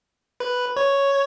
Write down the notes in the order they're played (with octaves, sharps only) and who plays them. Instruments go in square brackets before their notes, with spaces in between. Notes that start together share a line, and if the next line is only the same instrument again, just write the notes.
[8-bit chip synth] B4
C#5